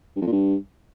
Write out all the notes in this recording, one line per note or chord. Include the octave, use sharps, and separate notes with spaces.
G2
F2
A#2
G2